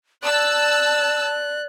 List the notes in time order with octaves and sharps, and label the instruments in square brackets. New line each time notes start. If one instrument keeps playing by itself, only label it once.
[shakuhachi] D5 [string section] A5 E6 [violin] F#6